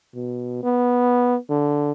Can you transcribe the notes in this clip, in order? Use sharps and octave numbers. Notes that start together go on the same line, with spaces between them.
B2
B3
D3